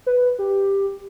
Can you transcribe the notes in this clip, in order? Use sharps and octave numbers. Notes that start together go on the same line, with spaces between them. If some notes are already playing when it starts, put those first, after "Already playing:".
B4
G4